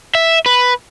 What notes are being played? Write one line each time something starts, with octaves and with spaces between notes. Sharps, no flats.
E5
B4